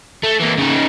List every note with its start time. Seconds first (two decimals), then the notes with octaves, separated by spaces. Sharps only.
0.24 A3
0.40 E3 A#3
0.59 C#3 D#4